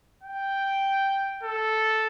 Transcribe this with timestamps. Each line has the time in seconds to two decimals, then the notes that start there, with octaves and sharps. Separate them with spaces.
0.24 G5
1.44 A4